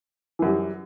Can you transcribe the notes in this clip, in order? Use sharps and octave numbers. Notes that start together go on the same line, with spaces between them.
F#2 E3 G3